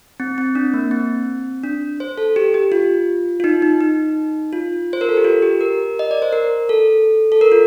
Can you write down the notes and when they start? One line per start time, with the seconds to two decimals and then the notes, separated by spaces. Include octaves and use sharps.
0.20 C4
0.38 C4
0.55 D4
0.74 A#3
0.91 C4
1.64 D4
2.00 C5
2.18 A4
2.36 G4
2.54 G4
2.72 F4
3.40 F4
3.44 D#4
3.62 D#4
3.81 D#4
4.53 F4
4.93 C5
5.01 A#4
5.09 A4
5.17 G4
5.24 F4
5.42 G4
5.61 A#4
5.99 D#5
6.11 D5
6.22 C5
6.33 A#4
6.69 A4
7.32 A4
7.41 A#4
7.52 F4